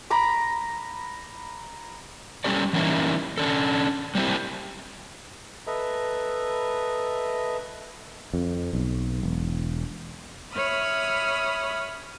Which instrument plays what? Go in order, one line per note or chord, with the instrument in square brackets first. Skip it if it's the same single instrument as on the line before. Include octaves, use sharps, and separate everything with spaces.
[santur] A#5 B5 D6
[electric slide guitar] G3 C#4 G4 A4 D5
E3 G3 A#3 C#4 D#4 E4
C#4 D4 A4
G3 A#3 C4 E4 G4
[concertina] A4 B4 D#5 E5 A#5
[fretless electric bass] F2
B1
E1
[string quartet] C#5 E5 B5 D#6 F6